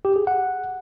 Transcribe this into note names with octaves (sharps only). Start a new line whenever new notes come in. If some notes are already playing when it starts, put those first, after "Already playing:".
G4
G#4
F#5